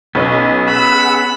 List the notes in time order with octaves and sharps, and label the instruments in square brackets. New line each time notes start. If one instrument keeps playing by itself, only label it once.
[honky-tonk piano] B1 C#5 [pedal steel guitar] B3 C#4 D#5
[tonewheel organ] G#4 F#5 E6 [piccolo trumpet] B5 [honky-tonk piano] B6